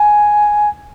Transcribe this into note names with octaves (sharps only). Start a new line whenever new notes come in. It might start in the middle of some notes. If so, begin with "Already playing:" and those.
Already playing: G#5